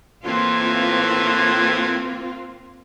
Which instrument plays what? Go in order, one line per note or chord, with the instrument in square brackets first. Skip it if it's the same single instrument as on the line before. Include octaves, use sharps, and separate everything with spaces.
[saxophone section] A2 E3 [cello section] A#3 C4 F4